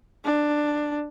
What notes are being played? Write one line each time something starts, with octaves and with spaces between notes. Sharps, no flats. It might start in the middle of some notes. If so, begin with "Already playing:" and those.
D4